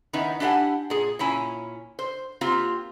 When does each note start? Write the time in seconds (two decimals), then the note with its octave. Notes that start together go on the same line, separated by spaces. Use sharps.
0.13 D#3 B3 C#4 D#4 E4
0.40 D4 E4 G4 E5 F#5 G#5
0.90 A#2 G#4
1.19 A#2 C#4 E4 G#5 A#5
1.99 C5
2.41 A#3 C4 F4 G4 F5